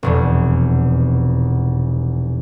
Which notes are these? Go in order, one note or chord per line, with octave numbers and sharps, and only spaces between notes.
F1 E2 B2